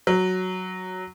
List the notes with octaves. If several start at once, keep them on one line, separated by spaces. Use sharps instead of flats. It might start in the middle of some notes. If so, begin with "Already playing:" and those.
F#3